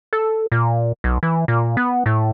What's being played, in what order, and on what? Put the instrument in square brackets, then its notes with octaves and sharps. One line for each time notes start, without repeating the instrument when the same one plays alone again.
[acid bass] A4
A#2
B1
E3
A#2
B3
A2